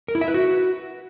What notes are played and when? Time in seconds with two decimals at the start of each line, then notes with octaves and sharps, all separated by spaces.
0.08 A#4
0.15 E4
0.21 E5
0.28 B4
0.34 F#4